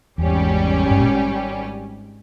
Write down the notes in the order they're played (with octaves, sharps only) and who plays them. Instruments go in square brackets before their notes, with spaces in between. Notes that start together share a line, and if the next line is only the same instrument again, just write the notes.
[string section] G#1 G#2 G3 C#4 G4 [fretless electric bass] E2
[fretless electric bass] G2
A#2